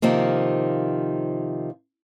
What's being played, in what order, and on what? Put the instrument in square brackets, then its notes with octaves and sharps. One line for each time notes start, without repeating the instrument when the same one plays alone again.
[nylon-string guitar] C3 D#3 F3 A#3